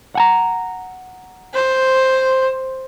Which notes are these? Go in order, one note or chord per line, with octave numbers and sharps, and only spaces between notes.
F#5 G#5 A#5
C5